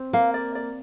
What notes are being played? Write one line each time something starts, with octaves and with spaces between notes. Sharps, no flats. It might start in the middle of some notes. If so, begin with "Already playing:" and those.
Already playing: C4
A#3 F5
D5
D5